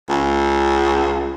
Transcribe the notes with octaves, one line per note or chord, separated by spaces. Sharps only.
C#2